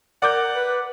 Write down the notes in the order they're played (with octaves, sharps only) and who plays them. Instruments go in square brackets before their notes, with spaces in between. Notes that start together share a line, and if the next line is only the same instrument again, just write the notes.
[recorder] A#4 [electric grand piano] D5 D6 G6 [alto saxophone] F#5
[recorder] B4